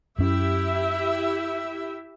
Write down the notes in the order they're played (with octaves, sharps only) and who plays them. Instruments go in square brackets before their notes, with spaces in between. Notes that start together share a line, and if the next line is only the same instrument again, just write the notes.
[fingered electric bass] F#2 C#4 [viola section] E4 G4 E5